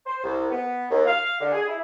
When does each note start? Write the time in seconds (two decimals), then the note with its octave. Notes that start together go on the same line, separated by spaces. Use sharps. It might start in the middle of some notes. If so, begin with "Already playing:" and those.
0.05 C5
0.23 C2
0.51 B3
0.90 D#2
1.06 F5
1.40 D3
1.53 G#4
1.68 E4